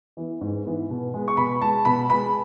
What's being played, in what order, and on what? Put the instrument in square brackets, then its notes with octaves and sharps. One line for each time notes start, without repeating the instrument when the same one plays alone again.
[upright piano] E3 B3
G#2
E3 B3
B2
G#3 B3
C#6
B2 B5
G#3 B3 A5
B2 B5
G#3 B3 B5